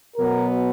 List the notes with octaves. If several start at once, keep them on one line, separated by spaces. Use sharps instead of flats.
B2 F#3 B3 A#4